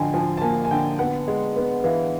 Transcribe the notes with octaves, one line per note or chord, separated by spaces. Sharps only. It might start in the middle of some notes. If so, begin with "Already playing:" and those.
Already playing: D3 F3 D#5 G5 G#5
F3 G#5
A5
A#3 G#5
G#5
D3 G5
B3 F#5
G#3
B3
E3 F5